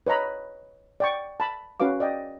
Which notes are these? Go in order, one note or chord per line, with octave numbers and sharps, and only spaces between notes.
B4 C#5 D#5 A#5 B5
D5 G5 C#6
A5 B5
C#4 F#4 B4 F5 D6
D5 D#5 G5